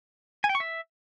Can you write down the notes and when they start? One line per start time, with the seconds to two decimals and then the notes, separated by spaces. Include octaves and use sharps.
0.44 G#5
0.49 G5
0.55 C#6
0.60 E5